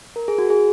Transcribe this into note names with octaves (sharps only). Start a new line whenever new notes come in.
A#4
G#4
F#4
G#4